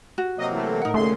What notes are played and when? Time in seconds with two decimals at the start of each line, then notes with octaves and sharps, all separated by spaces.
0.18 F#4
0.38 C3 F#3 A#3 D#5
0.51 E3 A3
0.82 A2 D#4 A#4 F#5
0.94 D#2 A#2 C#3 A3 C6